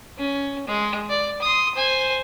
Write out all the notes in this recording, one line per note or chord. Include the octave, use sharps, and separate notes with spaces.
C#4
G#3
D5
C6 D#6
C5 G#5